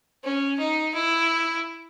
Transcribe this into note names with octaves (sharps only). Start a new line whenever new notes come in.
C#4
D#4
E4